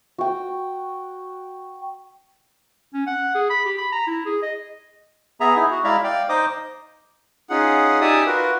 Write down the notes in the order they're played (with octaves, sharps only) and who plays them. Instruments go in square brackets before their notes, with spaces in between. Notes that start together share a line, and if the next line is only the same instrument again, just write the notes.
[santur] F#4 G5
[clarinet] C#4
F#5
G#4
B5
G4
B5
A#5
E4
G#4
D#5
[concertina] B3 G#4 E5 A#5
D#4 E4 G#4
F#4
G#3 E4 D5 E5 F5 A#5
D5 F5 G5
D#4 C5 D#5 D6 D#6
[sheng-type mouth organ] C#4 D#4 F4 G#4 F#5
D#4 G4 D5 E5 G#5 D#6
F4 F#4 A#4 B4